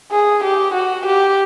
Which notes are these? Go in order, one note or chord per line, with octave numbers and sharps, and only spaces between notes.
G#4
G4
F#4
G4